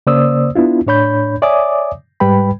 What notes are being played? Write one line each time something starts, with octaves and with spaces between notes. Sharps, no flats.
C#3 A#3 C5 D5 D#6 E6
B3 D4 E4 F4
A2 D4 C#5 B5 G6
C#5 D5 E5 G#5 D6 D#6
G#2 G3 B4 G5 B5